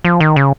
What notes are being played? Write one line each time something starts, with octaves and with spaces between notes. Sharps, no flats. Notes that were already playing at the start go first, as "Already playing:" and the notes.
F3
D#3
C#3